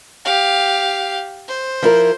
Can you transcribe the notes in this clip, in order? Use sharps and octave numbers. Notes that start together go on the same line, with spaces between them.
G4 F5
C5
F3 E4 A#4